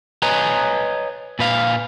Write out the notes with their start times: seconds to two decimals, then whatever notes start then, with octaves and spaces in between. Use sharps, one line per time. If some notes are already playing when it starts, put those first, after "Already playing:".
0.22 B4 C#5 D#5 G#5 A#5
1.39 A#2 B4 F5